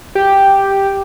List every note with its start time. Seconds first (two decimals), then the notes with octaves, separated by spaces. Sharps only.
0.15 G4